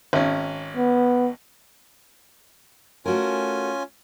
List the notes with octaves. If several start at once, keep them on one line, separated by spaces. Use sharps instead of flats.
G#1 C#4
B3
A3 C#4 F4 F#4 A#4 G#5